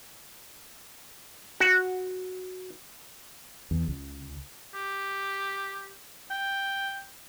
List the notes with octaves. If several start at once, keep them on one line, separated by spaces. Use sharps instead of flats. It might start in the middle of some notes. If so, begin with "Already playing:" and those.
F#4
E2
C#2
G4
G5